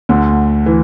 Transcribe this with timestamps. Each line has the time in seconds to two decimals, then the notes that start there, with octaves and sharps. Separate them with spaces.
0.09 D2 D3
0.66 E3